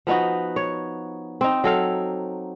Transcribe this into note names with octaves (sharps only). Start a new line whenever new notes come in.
F3 B3 D#4 F#4
C#5
C4 D#4
F#3 A4 F5